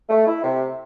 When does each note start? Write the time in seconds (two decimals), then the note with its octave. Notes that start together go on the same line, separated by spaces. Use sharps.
0.09 A3
0.27 E4
0.44 C3